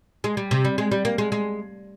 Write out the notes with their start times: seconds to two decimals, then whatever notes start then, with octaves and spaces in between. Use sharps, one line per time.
0.24 G#3
0.37 G3
0.51 C3
0.65 G3
0.78 G#3
0.92 G3
1.05 A#3
1.18 G#3
1.32 G#3